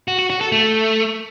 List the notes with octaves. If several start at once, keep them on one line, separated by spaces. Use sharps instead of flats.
F#4
F#4
F#4
A4
A3